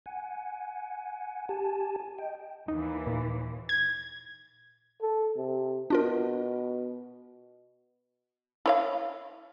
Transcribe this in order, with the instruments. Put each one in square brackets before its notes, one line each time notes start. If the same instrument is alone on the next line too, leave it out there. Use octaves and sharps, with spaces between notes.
[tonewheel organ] F#5 G#5
G4 G#5 A5
D#5 G5
[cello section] D#2 E3 [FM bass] D#4
[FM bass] A#2
[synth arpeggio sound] G#6
[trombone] A4
C3
[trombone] B2 [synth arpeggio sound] D4 F4 A#4
[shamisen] E4 C#5 F5